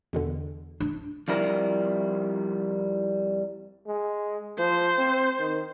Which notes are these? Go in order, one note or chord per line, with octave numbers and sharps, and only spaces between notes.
E2 B2 D3
D4
F2 G3 E4 A#4 A#5
G#3
F3 C5
C4
D#3